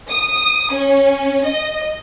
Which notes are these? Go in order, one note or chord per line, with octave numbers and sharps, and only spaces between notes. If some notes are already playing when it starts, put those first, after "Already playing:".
D#6
C#4
D#5